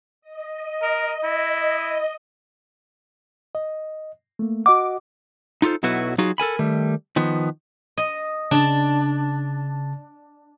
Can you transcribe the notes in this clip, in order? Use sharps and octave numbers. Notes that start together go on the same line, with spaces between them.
D#5
A#4
E4
D#5
A3 A#3
F#4 D#5 F#5 D6
D#4 F4 G4 A4 C5
B1 B2 F#3 E4 F#4 B4
F#3 D#4 F4 F#4 G#4
A4 A#4 G#5 B5
D#3 G3 A3
D#3 F3 B3
D#5
C#3 D4 A5 A6